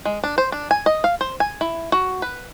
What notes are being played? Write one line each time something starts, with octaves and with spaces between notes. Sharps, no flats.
G#3
D4
C5
D4
G#5
D#5
F5
C5
G#5
E4
F#4
B4